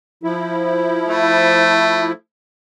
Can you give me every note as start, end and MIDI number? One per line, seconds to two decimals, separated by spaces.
0.23 2.13 53
0.23 2.13 64
1.09 2.10 57